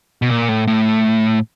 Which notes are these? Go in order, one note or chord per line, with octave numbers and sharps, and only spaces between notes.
B2
A#2
A2
A2